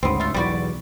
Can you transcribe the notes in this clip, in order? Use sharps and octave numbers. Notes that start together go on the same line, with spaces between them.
D2 G#2 C#3 B3 C4
A3 F4
B1 E2 G3 F#4 D5